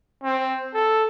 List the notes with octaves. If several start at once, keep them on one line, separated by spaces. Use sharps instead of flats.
C4
A4